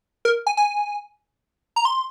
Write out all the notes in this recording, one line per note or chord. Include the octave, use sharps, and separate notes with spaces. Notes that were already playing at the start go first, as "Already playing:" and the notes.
A#4
G#5
G#5
A#5
C6